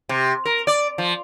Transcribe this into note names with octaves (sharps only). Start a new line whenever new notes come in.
C3
A#4
D5
F3